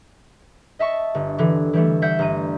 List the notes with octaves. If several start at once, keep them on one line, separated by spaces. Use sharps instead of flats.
D#5 E5 A5 C#6
G1
D3 E3
E3 G3 A3
G3 E5 F#5 G6
G1 A#5 D#7